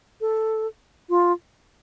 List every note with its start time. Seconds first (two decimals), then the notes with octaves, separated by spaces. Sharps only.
0.21 A4
1.09 F4